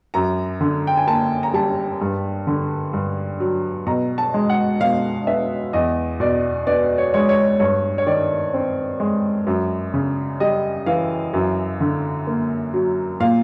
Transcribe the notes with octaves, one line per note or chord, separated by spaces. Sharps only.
F#2 A#5
D3
G5
G#5
A#3 A5
A#5
G3 A5
G2
D3
G2
F#3
B2 A#5
A5
G#3
F#5
B2 F5
B3 E5
E2 D#5
B2 D5
B3 D5
C#5
G#3 C#5
C#5
G2 C#5
C#5
D#3 D5
C4
G#3
F#2
C#3
G3 D#5
E3 F5
F#2
D3
A#3
F#3
A#2 F5